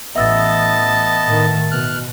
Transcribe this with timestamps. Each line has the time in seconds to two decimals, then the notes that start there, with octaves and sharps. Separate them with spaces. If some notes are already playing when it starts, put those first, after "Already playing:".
0.16 A1 B3 D#5 E5 A5 E6 A6
1.25 A2 D#3
1.71 B2 F6 F#6